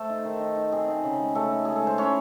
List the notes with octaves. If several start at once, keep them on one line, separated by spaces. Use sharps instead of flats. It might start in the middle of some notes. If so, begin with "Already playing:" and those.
Already playing: A3 A4 C5
D#4
D#3
D#4
D#4
C4 G#4
D#4
C#3
G#3
C#3 A3 A4
D#4
G#3 G#4
A4
G#3 C5
C#4 E4 C#5